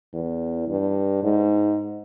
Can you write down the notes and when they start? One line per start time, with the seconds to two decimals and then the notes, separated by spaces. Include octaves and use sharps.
0.14 E2
0.69 G2
1.23 G#2